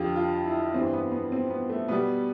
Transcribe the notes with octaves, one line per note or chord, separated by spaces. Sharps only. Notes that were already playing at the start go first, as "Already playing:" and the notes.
Already playing: F2 D3 F3 F4 G4
F4
E4
G2 E3 G3 C4
B3
B3
C4
B3
A3
B2 G3 B3